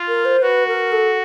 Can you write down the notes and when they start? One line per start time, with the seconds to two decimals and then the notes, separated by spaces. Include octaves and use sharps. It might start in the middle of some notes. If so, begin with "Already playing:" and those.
Already playing: F4
0.08 A#4
0.25 C5
0.42 F#4 B4
0.67 A#4
0.92 A4